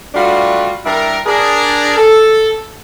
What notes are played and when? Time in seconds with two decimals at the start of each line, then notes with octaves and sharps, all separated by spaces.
0.15 G3 A3 D4 F4 F#4
0.85 G3 D4 E4 A#4
1.26 D4 G#4 A#4
1.97 A4